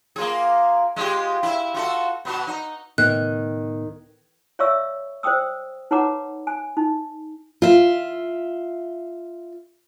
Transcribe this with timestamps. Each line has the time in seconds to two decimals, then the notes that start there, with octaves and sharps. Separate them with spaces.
0.16 A#3 F4 G#4
0.96 G#3 F4 G4
1.43 E4 E5
1.74 F4 F#4 A4
2.25 B2 B3 F#4
2.47 D#4
2.98 C#2 A2 D#3 B3 F#6
4.59 C#5 D5 E5 F5 C#6 E6
5.23 C5 D5 G5 D#6 E6
5.91 D#4 B4 C#5 F#5 A#5 D6
6.47 G#5
6.77 D#4
7.62 F4 E5